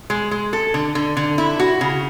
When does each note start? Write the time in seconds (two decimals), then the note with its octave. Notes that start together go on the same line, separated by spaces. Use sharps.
0.10 G#3
0.31 G#3
0.53 A4
0.74 D3
0.95 D3
1.17 D3
1.38 E4
1.59 F#4
1.81 C#3